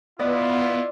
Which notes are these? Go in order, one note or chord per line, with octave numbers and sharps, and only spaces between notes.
B3 E4 F4 B4 D5 D#5